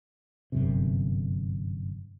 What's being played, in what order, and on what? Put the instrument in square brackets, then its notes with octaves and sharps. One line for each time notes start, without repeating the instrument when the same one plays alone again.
[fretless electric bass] G1 F#2 C3